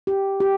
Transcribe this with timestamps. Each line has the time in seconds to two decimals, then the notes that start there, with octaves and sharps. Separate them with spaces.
0.07 G4
0.40 G4